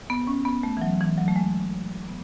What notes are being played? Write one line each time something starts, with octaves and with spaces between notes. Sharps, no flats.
B3
C#4
B3
A3
E3
F#3
E3
F#3
A3
G#3
B3